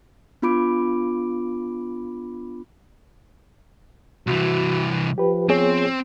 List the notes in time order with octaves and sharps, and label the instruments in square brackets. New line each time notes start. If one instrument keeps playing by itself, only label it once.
[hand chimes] B3 D4 F4 B5 D6 D7
[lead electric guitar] C2 E3 [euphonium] F#4
[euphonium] F3 [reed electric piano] G4 B4
[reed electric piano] B3 G#4 C#5 [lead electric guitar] C4